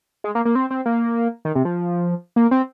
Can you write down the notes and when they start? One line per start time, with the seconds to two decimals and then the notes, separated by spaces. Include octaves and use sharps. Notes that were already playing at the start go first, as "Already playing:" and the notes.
0.24 G#3
0.35 A#3
0.45 A#3
0.55 C4
0.71 C4
0.86 A#3
1.45 D#3
1.55 C3
1.65 F3
2.36 A#3
2.51 C4